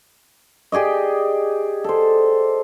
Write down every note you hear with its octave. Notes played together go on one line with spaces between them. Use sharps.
G4 G#4 D5 D#5
A4 C5